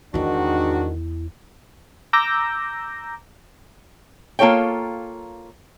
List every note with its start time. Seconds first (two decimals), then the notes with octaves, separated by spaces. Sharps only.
0.14 E2 G#2 D#3 D4 E4 F#4
2.13 A#5 D6 E6 G6 A#6
4.39 A#3 F4 A4 C#5 G5